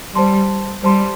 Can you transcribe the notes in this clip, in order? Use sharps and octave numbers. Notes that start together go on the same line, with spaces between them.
G3 C5 A5 C6
G3 C5 A5 C6